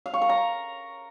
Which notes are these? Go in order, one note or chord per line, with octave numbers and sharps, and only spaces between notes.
F5
C#6
A#4
A#5